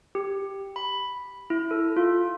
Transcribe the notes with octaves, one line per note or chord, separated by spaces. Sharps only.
G4
B5
E4
A4
F4